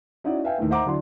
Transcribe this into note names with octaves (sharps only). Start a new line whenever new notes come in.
C#4 D#4 E4 F#4 D5
B4 E5 F5 G5 G#5
D#2 A2 A3
D#4 C5 E5 F#5 A#5 D6
D3 F#3 E4 D5 C6